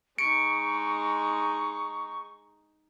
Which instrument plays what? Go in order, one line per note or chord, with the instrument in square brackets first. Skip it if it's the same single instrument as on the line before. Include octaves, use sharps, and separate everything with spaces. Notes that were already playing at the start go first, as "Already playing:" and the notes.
[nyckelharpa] G#3 D#4 [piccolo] C#6 [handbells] C#7 D7